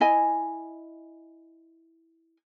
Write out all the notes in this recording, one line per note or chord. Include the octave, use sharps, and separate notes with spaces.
E4 D#5 G#5